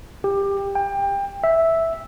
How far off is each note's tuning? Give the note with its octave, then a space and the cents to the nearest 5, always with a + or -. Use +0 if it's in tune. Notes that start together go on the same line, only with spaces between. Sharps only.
G4 +20
G5 +25
E5 -5